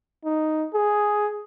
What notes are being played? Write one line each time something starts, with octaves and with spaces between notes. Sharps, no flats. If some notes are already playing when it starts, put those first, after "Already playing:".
D#4
G#4